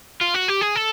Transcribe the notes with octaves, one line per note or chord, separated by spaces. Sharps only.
F4
F#4
G4
G#4
A4